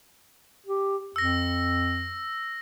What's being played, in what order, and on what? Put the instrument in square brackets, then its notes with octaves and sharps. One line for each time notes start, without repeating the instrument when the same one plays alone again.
[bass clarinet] G4
[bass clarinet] F2 [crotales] E6 A#6